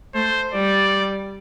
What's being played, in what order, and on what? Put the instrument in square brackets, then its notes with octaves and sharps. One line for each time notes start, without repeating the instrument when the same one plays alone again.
[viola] A3 [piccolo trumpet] C5
[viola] G3 [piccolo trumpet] D5